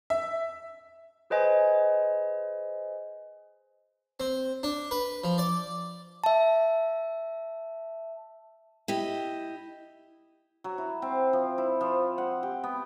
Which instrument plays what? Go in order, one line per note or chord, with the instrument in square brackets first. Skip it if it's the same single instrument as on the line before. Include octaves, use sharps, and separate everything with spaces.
[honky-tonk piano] E5
[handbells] G#4 B4 C5 D#5 G#5
[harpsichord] C4
D4
B4
F3
D5
[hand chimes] E5 A5
[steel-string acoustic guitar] E4 G4 D#5
[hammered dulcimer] F#3
E4
C4
F3
E4
F3
F#5
G4
B3